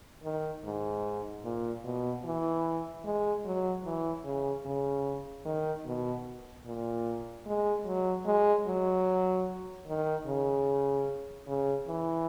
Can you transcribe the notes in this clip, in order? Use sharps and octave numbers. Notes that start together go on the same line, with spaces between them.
D#3
G#2
A#2
B2
E3
G#3
F#3
E3
C#3
C#3
D#3
B2
A#2
G#3
F#3
G#3
F#3
D#3
C#3
C#3
E3